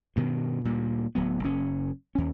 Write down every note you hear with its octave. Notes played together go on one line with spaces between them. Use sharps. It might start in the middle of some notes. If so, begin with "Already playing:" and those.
G2 B2 D#3
D2 A#2 G3
D1 F#3 B3
F#1 C#4
D#2 C#4